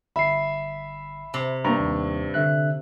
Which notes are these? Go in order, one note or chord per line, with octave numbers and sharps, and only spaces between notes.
G1 E5 B5 C7
C3
G2 A#3 A#5
D#2
D3 E5 F#6